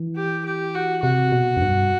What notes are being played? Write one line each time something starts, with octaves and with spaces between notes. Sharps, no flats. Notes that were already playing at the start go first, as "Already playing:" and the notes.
Already playing: E3
G4
G4
F#4
C3 F#4
B2
F#2
G2